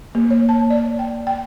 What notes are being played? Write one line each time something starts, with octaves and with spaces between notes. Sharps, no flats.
A#3
C#5
A5
D5
G5
G5